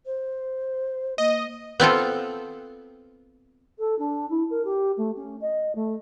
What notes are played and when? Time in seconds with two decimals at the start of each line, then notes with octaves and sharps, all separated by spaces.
0.05 C5
1.18 A#3 D#5
1.80 B3 C4 F4 A4
3.79 A4
3.98 D4
4.30 E4
4.50 A#4
4.65 G4
4.97 A3
5.16 C#4
5.41 D#5
5.75 A3